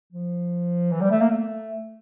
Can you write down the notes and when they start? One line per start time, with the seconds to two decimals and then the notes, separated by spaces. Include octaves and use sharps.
0.13 F3
0.91 E3
1.01 G3
1.10 A3
1.21 A#3
1.31 A3